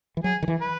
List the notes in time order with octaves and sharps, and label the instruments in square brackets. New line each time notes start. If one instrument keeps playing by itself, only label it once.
[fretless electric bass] E3
[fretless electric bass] F#3 [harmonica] G#4
[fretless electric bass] D#3
E3
[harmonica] B4